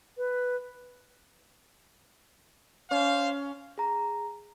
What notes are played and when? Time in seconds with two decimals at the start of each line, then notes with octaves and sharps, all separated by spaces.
0.18 B4
2.91 C#4 C5 F5
3.78 G#4 A#5